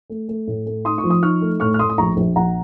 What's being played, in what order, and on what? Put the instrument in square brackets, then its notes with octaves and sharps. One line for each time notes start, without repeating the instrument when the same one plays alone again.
[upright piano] A3
A3
A2
A3
D#4 C6 D#6
C#6
F3
D#6
D#4 C#6 F6
A3
A2 C#6 F6
F6
A2 C6 D#6
D#6
A#1 A#5 C#6
A#1
A#1 F#5 A#5